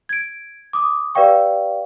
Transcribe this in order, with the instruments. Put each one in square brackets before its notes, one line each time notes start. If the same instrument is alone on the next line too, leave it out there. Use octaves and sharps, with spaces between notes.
[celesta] G#6 D7
D6 D#6
G4 B4 D5 F5 G5 C#6